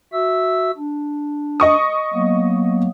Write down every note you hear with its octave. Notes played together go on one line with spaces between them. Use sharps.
F#4 E5 E6
D4
D#5 C#6 D#6
F#3 A#3 B3